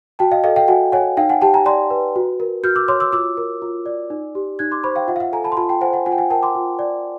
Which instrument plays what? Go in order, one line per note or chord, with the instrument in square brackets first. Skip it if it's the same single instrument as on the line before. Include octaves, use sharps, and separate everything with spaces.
[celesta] F#4 G5 A5
D#5 F5
A4 D#5 F5
F5 G5
F#4 F#5 G#5
C#5 F#5 G#5
D#4 F5 G5
F#5 G#5
G4 G5 A5
G#5 A#5
D5 A#5 C6
B4
F#4
A#4
F#4 F6 G6
D6 E6
C#5 C6 D6
D6 E6
F4 D6 E6
A#4
F4
D5
D#4
G4
D#4 F#6 G#6
C6 D6
C5 B5 C#6
F5 G5
F4 E5 F#5
F5
E5 F#5
A4 G#5 A#5
A5 B5
C6
F4 A5 B5
G5 A5
C5 F#5 G#5
F#5 G#5
F4 F#5 G#5
G5
F#5 G#5
A#4 G5 A5
C6 D6
F4
D5